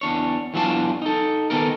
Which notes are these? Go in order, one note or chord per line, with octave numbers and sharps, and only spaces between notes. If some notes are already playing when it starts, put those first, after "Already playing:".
E2 D4 C#5
E2 E3 F#3 D4 F4 A5
D#4 A4
D#3 B3 A4 A#4